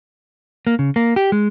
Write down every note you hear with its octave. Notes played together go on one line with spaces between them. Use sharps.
A#3
C#3
A#3
G4
G#3